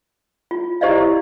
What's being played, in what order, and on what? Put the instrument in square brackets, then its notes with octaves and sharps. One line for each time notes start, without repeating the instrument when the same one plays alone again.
[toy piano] F4
E4 G4 C5 D5 D#5 F5